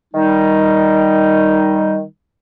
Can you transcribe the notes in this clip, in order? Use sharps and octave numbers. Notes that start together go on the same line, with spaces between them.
D#3 G3 D#4